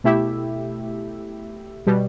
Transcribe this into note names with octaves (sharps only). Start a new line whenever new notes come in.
B2 A3 E4 G4 E5
B2 G3